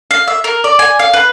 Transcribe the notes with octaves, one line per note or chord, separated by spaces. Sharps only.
F5
E5
A#4
D5
G#5
F5
B4